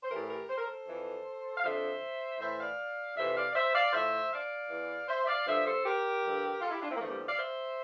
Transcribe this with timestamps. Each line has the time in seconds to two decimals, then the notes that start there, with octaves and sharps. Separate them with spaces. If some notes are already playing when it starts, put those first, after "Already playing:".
0.03 C5
0.10 A2 E3 G4 A#4
0.29 G4 A#4
0.49 C5
0.58 A#4
0.65 A4 C5
0.88 F2 E3
1.57 F5
1.63 F2 D3 F3 C5 E5
2.40 A2 E3 C5 E5
2.59 D5 F5
3.17 F2 C3 E3 C5 E5
3.36 D5 F5
3.51 D5
3.55 C5 E5
3.74 D5 F5
3.93 A2 F3 C5 E5
4.31 D5 F5
4.69 E2 E3
5.08 C5 E5
5.22 E5
5.27 D5 F5
5.46 G2 D3 F3 C5 E5
5.65 A4 C5
5.84 G4 A#4
6.24 G2 D3 F3
6.61 F4 A4
6.71 E4 G4
6.81 D4 F4
6.90 C4 E4
6.95 A#3
6.99 E2 D3 F3 A3
7.09 G3 A#3
7.28 D5 F5
7.37 C5 E5